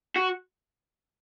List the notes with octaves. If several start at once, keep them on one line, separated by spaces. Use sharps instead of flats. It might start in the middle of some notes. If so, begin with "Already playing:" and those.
F#4